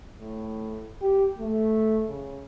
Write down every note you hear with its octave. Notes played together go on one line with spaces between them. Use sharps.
A2
G4
A3
C#3